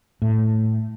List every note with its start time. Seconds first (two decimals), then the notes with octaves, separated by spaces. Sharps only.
0.22 A2